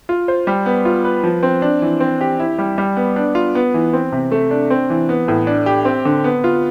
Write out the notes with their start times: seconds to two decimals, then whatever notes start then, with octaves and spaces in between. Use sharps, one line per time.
0.09 F4
0.28 C5
0.47 G3
0.66 B3
0.85 F4
1.04 B4
1.23 F3
1.43 C4
1.62 D4
1.82 E3
2.00 C4
2.21 G4
2.39 E4
2.58 G3
2.78 G3
2.97 B3
3.16 D4
3.35 F4
3.55 B3
3.74 E3
3.93 C4
4.12 C3
4.32 A3
4.51 D4
4.70 C4
4.90 E3
5.09 B3
5.28 A2
5.47 D4
5.66 G4
5.85 C4
6.05 D3
6.24 B3
6.44 F4